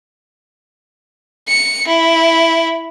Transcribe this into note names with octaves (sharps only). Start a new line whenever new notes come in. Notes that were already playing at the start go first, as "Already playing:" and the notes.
C#7
E4